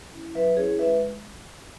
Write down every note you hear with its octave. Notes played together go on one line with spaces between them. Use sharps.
C#4 E4
F#3 B4 E5
C#4 E4 G#4 C#5
G#3 B4 E5